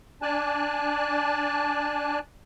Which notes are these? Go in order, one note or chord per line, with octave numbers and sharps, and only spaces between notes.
D4 D5 G#5 A5 F#6